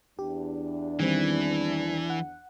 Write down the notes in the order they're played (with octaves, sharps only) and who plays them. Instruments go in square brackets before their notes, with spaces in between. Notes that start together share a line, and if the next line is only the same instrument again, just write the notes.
[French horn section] E2 D4 [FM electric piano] G4
[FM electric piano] D#3 G3 C4 [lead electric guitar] E3
[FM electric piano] F#5